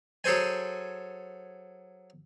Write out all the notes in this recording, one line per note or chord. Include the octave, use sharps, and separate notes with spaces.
F#3 G#4 A4 C5 G#5